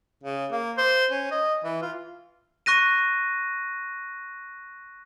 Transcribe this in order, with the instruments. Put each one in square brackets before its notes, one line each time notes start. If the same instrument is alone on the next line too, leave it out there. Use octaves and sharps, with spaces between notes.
[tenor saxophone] C#3
A#3
C5
C#4
D#5
E3
F4
[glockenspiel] C#6 F#6 A#6 D#7